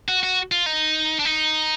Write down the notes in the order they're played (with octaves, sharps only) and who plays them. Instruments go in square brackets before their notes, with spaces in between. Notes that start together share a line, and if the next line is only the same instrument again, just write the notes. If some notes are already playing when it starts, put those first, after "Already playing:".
[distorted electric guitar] F#4
F#4
F4
D#4
D4
D#4